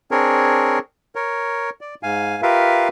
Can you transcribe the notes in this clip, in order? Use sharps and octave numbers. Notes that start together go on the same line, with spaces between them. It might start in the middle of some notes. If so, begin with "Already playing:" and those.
C4 D4 G#4 A#4 C#5
A#4 C#5
D5
G#2 F5 G#5
F4 G4 A#4 B4 E5 F5